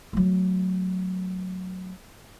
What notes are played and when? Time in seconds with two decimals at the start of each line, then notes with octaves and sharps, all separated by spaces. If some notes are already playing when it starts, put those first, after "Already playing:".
0.13 F#3 A3